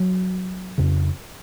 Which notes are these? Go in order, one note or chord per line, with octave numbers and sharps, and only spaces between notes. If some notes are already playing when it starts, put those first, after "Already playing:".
Already playing: F#3
F2 C#3